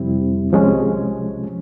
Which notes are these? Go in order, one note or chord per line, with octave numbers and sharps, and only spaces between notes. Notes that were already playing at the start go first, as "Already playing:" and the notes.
Already playing: F2 C3 G3 C4 E4
C2 C3 F3 G#3 C#4